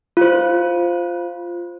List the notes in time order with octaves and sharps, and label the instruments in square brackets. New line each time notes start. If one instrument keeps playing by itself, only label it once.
[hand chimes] F4 C5